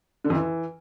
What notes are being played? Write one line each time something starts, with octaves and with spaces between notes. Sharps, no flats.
D3
F2
E3